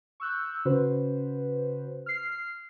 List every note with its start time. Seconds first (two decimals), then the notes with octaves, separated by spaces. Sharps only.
0.20 C#6 E6 F#6 G6
0.65 C#3 C#4 F#4 B4 C5
2.06 F6 C7